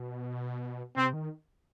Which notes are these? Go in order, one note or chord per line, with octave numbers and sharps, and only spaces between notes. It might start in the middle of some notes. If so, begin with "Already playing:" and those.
Already playing: B2
C3 C4
D#3